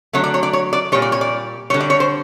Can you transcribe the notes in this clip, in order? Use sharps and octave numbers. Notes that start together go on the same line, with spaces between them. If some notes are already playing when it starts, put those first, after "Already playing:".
D3 F#3 A3 C#5
D5
C#5
D5
C#5
D5
A#2 G3 C#5
D5
C#5
D5
D3 G3 C#5
D5
C#5
C5